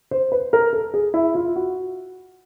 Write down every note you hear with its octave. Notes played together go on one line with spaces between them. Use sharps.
C5
B4
A#4
A4
G#4
E4
F4
F#4